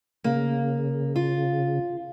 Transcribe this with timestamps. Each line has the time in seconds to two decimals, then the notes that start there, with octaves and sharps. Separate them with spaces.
0.24 C#3 A#3
1.16 F4